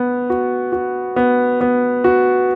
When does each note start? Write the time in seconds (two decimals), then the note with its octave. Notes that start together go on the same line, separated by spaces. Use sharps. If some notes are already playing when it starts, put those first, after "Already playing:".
Already playing: B3
0.30 F#4
0.72 F#4
1.16 B3
1.61 B3
2.04 F#4